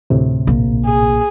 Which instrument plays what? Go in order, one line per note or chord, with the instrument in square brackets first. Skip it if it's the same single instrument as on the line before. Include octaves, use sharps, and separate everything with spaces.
[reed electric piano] D2 A2 C3
[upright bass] A#1 A#3
[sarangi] G#4